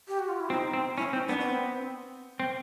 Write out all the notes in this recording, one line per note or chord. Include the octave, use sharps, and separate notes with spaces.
G4
F#4
F4
E4
C4 D#4
C4
C#4 E4
C4 D#4
B3 D4
C#4
C4
C4